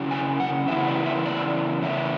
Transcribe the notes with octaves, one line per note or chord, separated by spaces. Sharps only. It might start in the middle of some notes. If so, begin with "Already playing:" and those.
Already playing: C#3 F#3 C#4 E4
G#5
F#5
C#3 E3 B3 E4 E5
D5
E5
D5
C#3 E3 B3 E4 E5